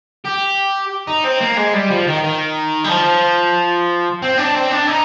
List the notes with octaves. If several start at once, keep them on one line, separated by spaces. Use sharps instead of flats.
G4
D#4
C4
A#3
G#3
G3
F3
D#3
D#3
G3
F3
C4
D4
C4
D4
D#4